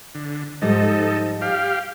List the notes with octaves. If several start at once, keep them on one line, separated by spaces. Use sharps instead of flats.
D3
G#2 F3 G3 D#4 A4
G4 F5